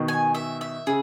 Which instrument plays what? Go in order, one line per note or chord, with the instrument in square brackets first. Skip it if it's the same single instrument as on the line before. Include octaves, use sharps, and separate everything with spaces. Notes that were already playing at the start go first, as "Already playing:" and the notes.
Already playing: [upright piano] B2 D#3
[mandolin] G#5
E5
E5
[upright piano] C#3 [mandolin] G#4